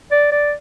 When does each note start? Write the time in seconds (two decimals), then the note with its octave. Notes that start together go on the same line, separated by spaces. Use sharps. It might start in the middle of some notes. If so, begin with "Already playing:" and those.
0.11 D5
0.31 D5